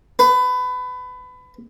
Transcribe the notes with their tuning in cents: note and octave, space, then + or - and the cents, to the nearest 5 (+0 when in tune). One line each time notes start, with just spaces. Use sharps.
B4 +25